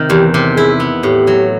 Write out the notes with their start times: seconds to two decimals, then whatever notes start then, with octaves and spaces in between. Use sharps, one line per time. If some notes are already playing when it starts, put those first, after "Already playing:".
Already playing: C3 D#3
0.10 E2 G4
0.34 C3
0.56 E4 G#4
0.80 B3
1.03 A2 G4
1.27 F#3